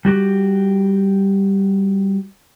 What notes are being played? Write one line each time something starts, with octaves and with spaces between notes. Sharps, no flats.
G3 F#4 G4